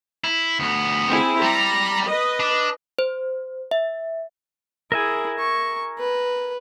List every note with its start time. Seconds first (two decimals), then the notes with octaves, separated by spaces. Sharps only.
0.24 E4
0.60 D2 B3
1.08 C4 E4 G#4
1.43 G3 A#5
2.06 B4 D#5
2.40 D4
2.99 C5
3.71 E5
4.92 E4 G#4 A#4 E5 G#5
5.39 C#6
5.99 B4